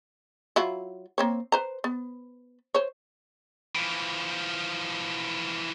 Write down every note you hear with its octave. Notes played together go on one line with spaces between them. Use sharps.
F#3 E4 F4
A#3 C4 C#5
B4 C5 A#5
B3
C5 C#5
E3 F3